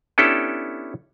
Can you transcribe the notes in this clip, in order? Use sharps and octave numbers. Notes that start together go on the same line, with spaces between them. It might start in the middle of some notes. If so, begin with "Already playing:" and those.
B3 C#4 D4 E4 G4 A4